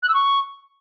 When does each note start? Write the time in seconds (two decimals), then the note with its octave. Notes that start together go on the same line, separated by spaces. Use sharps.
0.02 F#6
0.08 E6
0.14 C#6